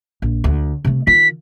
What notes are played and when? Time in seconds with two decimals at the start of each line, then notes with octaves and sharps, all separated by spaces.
0.22 A#1
0.44 D2
0.85 C3 A3
1.07 D#3 F4 B6